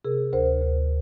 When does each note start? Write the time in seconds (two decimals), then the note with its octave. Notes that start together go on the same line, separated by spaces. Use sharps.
0.04 C3 G#4 A#4
0.33 D2 A#4 C5
0.62 D2